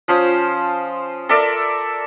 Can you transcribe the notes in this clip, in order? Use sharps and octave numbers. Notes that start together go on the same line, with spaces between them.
F3 C#4 C5 D#6
A4 A#4 D5 E5